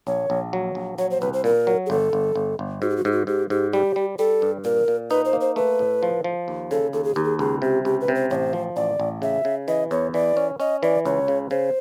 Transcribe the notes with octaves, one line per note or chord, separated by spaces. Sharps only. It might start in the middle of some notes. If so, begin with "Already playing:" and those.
A#1 C#5
A#1
F#3
A#1
F#3 C#5
C5
C2 B4
C5
A#2 A#4
F#3
G#4
G1 A4
G1
G1
G1
G#2 F#4
G4
F#4
G#2 G4
F#4
G#2 G4
G#2 G4
G3 G4
G3
G3 A4
G2
A#2 A#4
A#2
D#4 B4
C5
A#3
C5
A3 B4
A2
F3
F3
D#2
C#3 A4
D#2 A4
G#4
D#2 G4
G#4
C#2 G#4
C3 G4
C#2 G4
B4
C3
C5
A1 C5 C#5
F3
A1 D5
A1
C#3 E5
C#3
E3 D#5
E2 C#5
E3 D5
C#4
C#4 D#5
E3 D5
C#2 C#5
C#3
C#3 C5